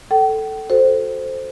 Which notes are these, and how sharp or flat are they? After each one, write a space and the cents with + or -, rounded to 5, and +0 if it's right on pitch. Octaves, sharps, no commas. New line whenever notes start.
A4 +0 G5 -45
F#4 +0 A4 +0 C5 +0